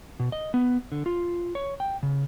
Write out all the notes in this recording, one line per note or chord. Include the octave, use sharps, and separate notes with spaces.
B2
D#5
B3
D3
F4
C#5
G5
C#3